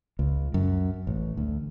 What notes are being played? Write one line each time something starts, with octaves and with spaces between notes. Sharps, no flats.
C#2
F#2
A1
D2